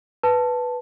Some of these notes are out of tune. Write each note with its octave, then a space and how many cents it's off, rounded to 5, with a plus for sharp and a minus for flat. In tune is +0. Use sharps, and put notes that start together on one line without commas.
B4 +0 A5 +0